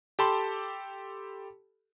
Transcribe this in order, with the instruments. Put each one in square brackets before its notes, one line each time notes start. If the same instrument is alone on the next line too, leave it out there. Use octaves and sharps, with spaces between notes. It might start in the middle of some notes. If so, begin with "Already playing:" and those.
[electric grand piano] G4 A4 A5 B5 C6